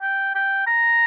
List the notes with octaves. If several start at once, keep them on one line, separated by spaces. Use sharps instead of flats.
G5
G5
A#5